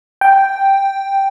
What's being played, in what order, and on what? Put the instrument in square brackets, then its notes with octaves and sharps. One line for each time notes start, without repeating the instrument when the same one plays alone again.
[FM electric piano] G5